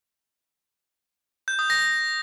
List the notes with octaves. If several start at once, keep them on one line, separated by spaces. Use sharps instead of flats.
G6
D#6
A#6